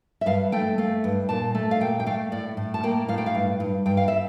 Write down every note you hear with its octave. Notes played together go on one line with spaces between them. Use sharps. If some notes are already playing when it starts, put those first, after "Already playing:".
E5
G2 F5
A3 G5
A3 F5
G2
A#2 A5
A3
F5
A#2 G5
G5
A3 F5
A2 D5
A2
A5
A#3 G5
A2 F5
G5
F5
G2
G2
G2 G5
F5
E5